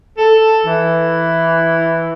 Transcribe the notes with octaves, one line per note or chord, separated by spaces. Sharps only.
A4
E3